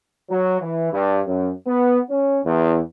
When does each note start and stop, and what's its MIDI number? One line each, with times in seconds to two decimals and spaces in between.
0.30 0.60 54
0.61 0.93 52
0.93 1.19 43
1.26 1.50 42
1.66 2.00 59
2.10 2.39 61
2.45 2.79 40